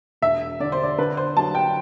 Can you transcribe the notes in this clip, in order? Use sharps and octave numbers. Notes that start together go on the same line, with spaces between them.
E1 E5
D3 D5
C5
D5
D3 B4
C5
F#3 A5
G5